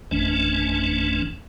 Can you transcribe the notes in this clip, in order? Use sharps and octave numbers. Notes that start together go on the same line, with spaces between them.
G#1 F2 E3 A3 C#4 D4